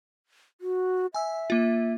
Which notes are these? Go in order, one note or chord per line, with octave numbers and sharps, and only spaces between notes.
F#4
E5 G#5 E6
A#3 F4